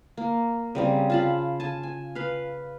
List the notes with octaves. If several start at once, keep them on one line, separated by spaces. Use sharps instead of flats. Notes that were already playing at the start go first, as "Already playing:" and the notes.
A#3
C#3 G3 C4
F4 A5 B5
G#5 A5
G#5
B4 F5